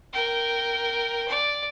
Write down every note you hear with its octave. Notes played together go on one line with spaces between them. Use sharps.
A#4 G5
D5